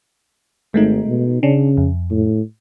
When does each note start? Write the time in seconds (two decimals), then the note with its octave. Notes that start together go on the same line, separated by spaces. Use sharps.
0.74 G#1 G#3 A3 D#4
1.07 B2
1.43 C#3 C#4 D4
1.77 F2
2.10 A2